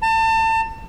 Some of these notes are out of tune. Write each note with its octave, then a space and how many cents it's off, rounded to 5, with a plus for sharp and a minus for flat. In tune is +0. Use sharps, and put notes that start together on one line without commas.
A5 +30